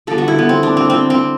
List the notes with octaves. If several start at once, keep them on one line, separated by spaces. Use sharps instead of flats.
D3 G3 B3 A4
F#4
E4
B3
C4
D4
C4
C4
C4